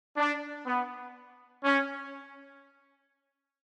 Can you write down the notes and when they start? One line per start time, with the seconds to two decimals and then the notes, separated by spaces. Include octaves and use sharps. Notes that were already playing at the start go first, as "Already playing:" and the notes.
0.17 D4
0.67 B3
1.64 C#4